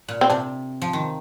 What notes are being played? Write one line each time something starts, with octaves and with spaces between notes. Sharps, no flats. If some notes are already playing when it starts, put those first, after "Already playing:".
A#2
C4
C3 D4
F3
D#3